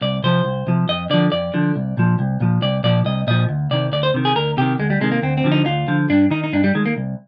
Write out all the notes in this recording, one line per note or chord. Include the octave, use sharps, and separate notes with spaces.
C2 D5
C3 F3 C5
C2
C3 F3
F2 D#5
D3 F3 D5
F2 D5
D3 F3
C2
A#2 F3
C2
A#2 F3
C2 D5
A#2 F3 D5
C2 D#5
A#2 F3 D#5
D2
C3 D#3 D5
D2 D5
C5
C3 D#3
G#4
D2 A#4
C3 D#3 G4
D2 G#3
G3
C3 D#3 G#3
A#3
D2 C4
C4
D3 F3
D#4
D2 F4
D3 F3
G2 D4
D#3 D#4
D#4
G2 D4
G3
D#3 G#3
A#3
C2